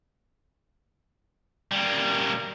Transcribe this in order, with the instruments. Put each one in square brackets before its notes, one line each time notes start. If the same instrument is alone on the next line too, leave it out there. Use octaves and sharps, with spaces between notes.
[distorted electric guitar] G3 A#3